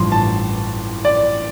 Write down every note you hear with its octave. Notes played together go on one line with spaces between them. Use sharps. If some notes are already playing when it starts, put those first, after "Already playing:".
Already playing: A1 G2 F3 C6
A5
D5